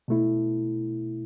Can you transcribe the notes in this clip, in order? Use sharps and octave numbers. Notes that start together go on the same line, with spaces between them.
B2 A3 E4